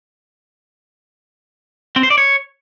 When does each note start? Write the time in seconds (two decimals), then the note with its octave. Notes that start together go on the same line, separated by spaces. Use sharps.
1.96 C4
2.03 C5
2.10 D5
2.18 C#5